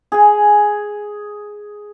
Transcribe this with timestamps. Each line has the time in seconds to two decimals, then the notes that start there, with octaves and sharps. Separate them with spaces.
0.12 G#4 G#5